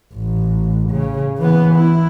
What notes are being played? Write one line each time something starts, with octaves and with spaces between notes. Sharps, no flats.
A1
C#3
E3 B3
E4